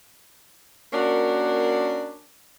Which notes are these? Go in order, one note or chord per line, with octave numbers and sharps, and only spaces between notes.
A#3 C#4 D4 F#4 A#4